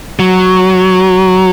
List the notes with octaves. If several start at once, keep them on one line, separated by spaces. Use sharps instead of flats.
F#3